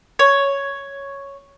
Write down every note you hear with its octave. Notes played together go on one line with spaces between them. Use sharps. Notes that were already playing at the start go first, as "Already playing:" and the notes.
C#5